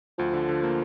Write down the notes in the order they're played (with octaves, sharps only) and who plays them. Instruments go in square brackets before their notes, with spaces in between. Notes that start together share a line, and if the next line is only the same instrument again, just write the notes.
[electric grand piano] D2 [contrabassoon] F3
[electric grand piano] D3
D3
A#3